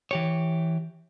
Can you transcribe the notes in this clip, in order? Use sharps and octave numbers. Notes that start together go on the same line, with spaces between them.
E3 G4 C#5